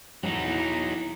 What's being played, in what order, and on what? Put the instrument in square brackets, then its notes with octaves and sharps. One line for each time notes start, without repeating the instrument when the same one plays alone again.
[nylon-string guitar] E2 G2 [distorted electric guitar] F#3 D#4